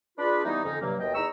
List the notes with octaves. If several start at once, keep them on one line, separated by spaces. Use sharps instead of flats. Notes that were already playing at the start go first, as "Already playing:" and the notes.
D4 F4 G#4 B4
E3 G3 A3 B3 D#4
F2 D3 C#4 D#4
G2 C3 F#3 A#3
D#2 B2 A3 D#5 G5
E2 D#4 A#5 C#6 E6